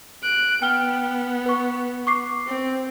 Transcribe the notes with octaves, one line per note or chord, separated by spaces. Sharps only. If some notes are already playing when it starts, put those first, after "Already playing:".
F#6 D7
B3 G5 F6 G7
B4 C#6
C#6 D6 C7
C4